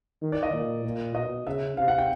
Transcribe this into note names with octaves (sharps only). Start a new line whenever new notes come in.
D#3
D5
D#5
A#2
A#2
B2 D#5
C#3 E5
C3 F5
F#5
G5